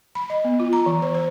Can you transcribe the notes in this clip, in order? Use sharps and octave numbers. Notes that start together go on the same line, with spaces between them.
B5
D#5
B3
F4
A#5
E3
C5
C5